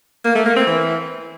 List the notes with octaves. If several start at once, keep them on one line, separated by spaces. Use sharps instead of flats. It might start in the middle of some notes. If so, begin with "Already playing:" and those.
A#3
A3
A#3
C4
E3